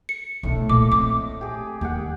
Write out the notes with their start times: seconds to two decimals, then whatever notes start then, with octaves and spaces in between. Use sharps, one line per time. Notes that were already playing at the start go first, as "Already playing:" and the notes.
0.09 C#7
0.43 B1 A2 A3 D4
0.70 A#2 D#5 D6
0.92 C4 D6
1.41 G4 G#4
1.81 D#2 G4 G#4 F#5